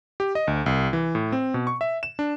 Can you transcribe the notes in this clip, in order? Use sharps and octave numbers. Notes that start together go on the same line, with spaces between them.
G4
D#5
D2
C2
E3
A2
C4
B2
C#6
E5
E7
D4